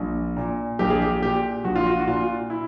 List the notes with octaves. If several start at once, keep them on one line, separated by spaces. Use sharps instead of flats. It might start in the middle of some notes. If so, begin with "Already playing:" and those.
Already playing: A#1
A#2
A#1 G4
G#4
G4
A#2 G4
A#1 F#4
F4
F#4
F#4
A#2 F4
E4